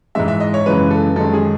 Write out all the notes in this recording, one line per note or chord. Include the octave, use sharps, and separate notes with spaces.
G#2 E3 G#3 E5
E5
D#5
C#5
F#2 C#3 E3 G#3 B4
A4
F#2 D#3 G#3 A4
G#4